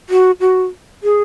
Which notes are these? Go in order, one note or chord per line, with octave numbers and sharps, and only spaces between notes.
F#4
F#4
G#4